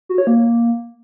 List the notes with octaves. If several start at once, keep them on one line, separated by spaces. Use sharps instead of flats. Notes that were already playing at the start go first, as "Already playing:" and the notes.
F#4
C#5
A#3